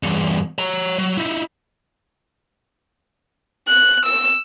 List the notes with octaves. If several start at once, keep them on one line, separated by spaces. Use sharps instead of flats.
E2 G2
C#5 A#5
F#3
D#4 E4
F#6
E6